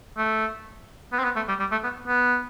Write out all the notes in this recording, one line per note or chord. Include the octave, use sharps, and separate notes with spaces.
A3
B3
C4
B3
A3
G3
G3
A3
B3
B3